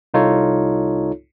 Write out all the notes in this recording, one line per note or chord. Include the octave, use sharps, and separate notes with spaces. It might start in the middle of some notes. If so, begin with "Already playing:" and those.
C2 D#4 F4 A4 C#5